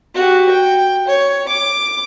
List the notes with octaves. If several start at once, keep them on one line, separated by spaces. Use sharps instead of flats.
F#4 G4
G5
C#5
D6